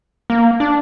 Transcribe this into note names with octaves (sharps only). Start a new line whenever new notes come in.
A#3
D4